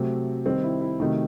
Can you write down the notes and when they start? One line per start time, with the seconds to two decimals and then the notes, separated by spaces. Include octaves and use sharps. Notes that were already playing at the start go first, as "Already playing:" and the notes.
Already playing: C3 F#3 A3 C4
0.45 D#3 G3 C4
0.64 E4
0.81 E4
1.00 C3 D#3 F#3 A3 D#4